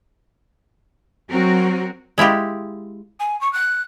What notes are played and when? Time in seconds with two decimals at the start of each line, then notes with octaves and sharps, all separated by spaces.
1.30 F#3 C4 F#4 A#4
2.18 G#3 E4 F4 G4
3.20 G#5
3.41 C#6
3.53 F#6